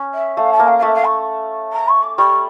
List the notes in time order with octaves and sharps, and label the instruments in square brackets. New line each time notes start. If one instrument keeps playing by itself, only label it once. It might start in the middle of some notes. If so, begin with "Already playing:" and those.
Already playing: [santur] C#4
[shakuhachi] E5
[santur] A3 [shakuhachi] F5
[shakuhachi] A5
[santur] A#3
[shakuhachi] F5
F5
[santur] A3 [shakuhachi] E5
[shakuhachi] F5
C#6
A#5
C#6
D6
[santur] G3 [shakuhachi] C#6